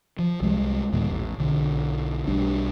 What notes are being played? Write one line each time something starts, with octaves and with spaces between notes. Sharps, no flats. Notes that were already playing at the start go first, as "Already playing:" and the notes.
F3
C2 G3 G#3
D#2 A#2 G#3 B3
A1
B1 D3
B1 G3 D4